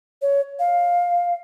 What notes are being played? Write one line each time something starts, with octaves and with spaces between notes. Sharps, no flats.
C#5
F5